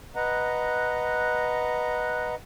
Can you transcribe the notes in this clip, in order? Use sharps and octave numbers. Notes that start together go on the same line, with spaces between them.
B4 D#5 F#5 A#5